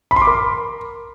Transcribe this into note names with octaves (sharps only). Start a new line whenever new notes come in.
B5
C6
D6
A#4